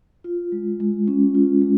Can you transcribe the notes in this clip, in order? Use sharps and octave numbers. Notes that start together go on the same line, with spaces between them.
F4
G#3
G#3
C#4
F4
G#3